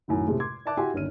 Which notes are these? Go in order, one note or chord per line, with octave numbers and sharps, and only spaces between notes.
B1 F#2 A2 D#3
A2 C3 G#3 A3
C6 D6 G#6
D5 E5 A5 D6 F#6
E4 F#4 G4 E5 G#5 C6
G1 D#2 C#4 F6 D#7